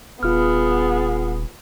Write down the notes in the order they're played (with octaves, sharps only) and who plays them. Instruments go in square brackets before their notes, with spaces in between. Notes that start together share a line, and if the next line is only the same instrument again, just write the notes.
[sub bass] D#1 [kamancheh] B3 G#4 [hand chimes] F4 F6